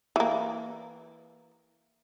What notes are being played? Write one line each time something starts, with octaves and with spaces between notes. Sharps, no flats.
E3 A#3